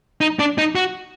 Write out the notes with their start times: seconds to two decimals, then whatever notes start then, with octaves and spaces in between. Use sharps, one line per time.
0.21 D#4
0.39 D4
0.58 D#4
0.75 F#4